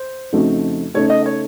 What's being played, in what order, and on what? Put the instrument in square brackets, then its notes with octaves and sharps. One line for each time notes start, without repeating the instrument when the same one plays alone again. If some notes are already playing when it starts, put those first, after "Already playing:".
Already playing: [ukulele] C5
[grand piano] F2 C#3 A3 D#4 F#4
[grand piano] C#3 A3 D#4 A4 [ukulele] C#5
[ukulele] D#5
C#5